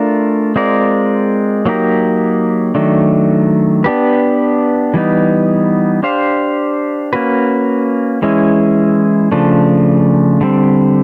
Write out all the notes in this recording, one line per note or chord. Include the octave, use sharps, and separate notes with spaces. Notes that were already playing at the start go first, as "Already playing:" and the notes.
Already playing: A3 D4 F4 A#4
G#3 C4 F4 A#4 D5
F#3 A#3 D#4 G4 A#4
D#3 F#3 A3 D4
B3 D4 G4 B4
E3 G3 B3 D#4
D4 G4 C5 F5
A#3 C#4 F#4 B4
E3 G#3 C#4 E4
C#3 F3 A3 D4
D3 G3 C4